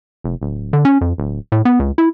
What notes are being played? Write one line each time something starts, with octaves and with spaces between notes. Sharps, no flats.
F1
D1
D3
C#4
F2
D1
A2
B3
C#2
E4